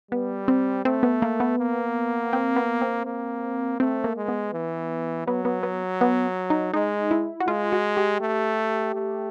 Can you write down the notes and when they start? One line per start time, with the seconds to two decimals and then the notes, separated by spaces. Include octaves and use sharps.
0.11 G3 B3
0.48 C4
0.85 A3 C4
1.03 B3
1.22 A#3
1.40 B3
1.59 A#3
2.33 C4
2.56 B3
2.81 C4
3.06 A#3
3.80 A3 C4
4.04 A#3
4.17 G#3
4.28 B3
4.54 E3
5.27 F#3 B3
5.45 B3
5.63 B3
6.01 B3
6.50 D#4
6.74 G#3 D#4
7.11 E4
7.40 F#4
7.48 G#3 F4
7.72 F#4
7.97 G4
8.21 A3
8.95 A3